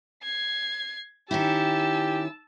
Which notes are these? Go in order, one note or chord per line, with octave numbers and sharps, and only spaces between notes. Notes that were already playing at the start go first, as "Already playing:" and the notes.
G#6 C7
D#3 C#4 E4 G4 A5 E6